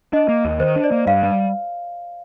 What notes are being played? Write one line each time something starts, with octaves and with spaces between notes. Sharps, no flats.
D4 D#5
A#3
D#2
D#3 C5
D4
D5
A#3
G2 F5
G3